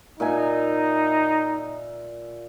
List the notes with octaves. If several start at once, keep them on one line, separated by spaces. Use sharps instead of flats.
A#2 D#4 E5 G#5